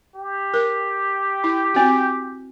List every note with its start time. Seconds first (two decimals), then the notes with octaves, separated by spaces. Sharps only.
0.15 G4
0.54 A#4
1.44 E4
1.74 C4 F#4